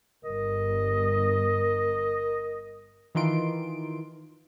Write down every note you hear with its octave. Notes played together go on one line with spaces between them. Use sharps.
G1 A#4 D#5
D#3 E3 D#4 F4 C6 D7